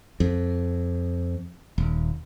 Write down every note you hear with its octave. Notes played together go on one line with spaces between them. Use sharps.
F2
D#1